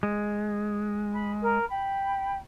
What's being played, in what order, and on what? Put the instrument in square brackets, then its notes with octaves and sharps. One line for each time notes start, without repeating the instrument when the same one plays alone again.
[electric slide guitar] G#3
[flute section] B5
A#4
G5 B5